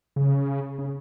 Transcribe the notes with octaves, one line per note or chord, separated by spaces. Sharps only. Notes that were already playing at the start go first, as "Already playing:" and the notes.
C#3
C#3